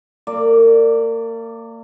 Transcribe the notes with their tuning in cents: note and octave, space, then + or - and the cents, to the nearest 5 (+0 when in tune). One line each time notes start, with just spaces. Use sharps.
A#3 -35 D5 +0